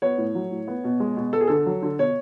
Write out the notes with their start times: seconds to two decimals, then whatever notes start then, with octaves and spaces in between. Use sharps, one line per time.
0.02 B3 C#5
0.18 A2
0.35 F#3
0.51 A2
0.68 B3
0.84 B2
1.00 G#3
1.17 B2
1.33 B3 A4
1.41 G#4
1.47 D3 A4
1.66 F#3
1.82 D3
1.99 B2 C#5